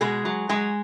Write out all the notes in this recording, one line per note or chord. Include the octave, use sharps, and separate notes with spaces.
B2 G#3 G#4
F#3
F#3 G#3 G#4